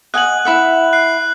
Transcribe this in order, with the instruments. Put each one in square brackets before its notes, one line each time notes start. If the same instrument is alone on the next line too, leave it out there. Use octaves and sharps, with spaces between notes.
[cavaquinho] D#5 F#5 G#5 [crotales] F#6 F#7
[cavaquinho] E4 E5 F#5
[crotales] F#6 C7